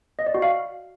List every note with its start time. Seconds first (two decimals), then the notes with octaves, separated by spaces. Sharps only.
0.19 D#5
0.27 D5
0.34 F#4
0.42 F5